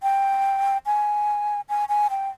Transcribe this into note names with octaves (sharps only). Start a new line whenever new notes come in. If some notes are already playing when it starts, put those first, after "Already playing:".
G5
G#5
G#5
G#5
G5